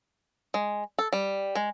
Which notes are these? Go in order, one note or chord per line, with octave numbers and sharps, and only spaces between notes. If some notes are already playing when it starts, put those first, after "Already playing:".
G#3
A4
G3
G#3